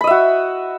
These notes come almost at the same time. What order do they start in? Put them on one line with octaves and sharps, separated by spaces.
B5 D#5 E5 F#4